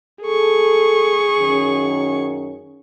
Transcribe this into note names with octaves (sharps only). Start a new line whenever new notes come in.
G#4 A4 C#6
F#2 D#3 C#4